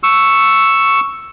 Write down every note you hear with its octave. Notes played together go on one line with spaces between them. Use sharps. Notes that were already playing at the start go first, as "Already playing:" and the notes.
C#6 E6